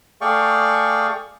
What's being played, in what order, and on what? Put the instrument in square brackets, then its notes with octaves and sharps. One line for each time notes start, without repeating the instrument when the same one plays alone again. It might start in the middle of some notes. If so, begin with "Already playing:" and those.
[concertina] A3 G#4 D5 F5 G5 C#6